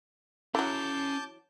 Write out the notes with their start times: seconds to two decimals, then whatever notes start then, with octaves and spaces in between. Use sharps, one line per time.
0.55 E3 F#3 C#4 A5 B5 D6 G6